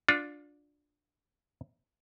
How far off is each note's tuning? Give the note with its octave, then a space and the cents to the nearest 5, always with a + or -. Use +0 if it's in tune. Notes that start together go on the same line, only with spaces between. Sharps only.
D4 +0 F4 +30